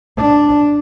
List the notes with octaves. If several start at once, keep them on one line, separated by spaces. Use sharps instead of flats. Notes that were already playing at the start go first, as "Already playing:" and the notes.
D4